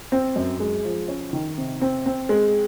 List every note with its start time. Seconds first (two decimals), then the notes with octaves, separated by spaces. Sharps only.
0.12 C4
0.36 F#2
0.60 G#3
0.84 F3
1.08 C#4
1.33 D#3
1.57 C3
1.81 C4
2.06 C4
2.29 G#3